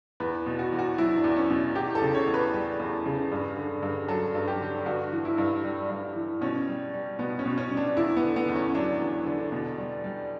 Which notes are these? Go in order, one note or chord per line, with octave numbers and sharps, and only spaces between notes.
E2 B4
B2
F#4
E2
F#4
F#3 E4
D4
E2
C#4
B2
E2 G4
A4
C#3
C#5
E2
B4
G3
E2
C#3
G2
D3
G2
F#3 A4
G2
G4
D3
G2 F#4
E3
E4
G2
G3
G2
E3
B2 C#4
G3
G3
B2 B3
C#4
B2
C#4
G3
D4
E2 E4
B3
D3
B3
E2
C#4
F#3 D4
E2
D3
B2
G3
G3